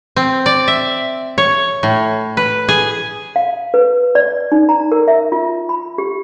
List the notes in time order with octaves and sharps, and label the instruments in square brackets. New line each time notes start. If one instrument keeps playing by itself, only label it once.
[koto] C4
D5
E5
C#5
A2
B4
G#4
[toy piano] F5
B4
D5
D#4
A#5
A#4
E5
F4
B5
G4